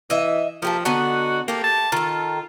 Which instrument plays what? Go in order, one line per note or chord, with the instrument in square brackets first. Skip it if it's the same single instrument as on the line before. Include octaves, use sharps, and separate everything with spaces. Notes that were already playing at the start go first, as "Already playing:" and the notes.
[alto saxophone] E3 [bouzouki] D#5 E5
[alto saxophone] F3 [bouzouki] A#3 G4 A4
[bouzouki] D3 B3 D#4 [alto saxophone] F#4
[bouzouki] A3 G4 [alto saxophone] A#3
[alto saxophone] A5
[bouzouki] D#3 A4 [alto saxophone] F4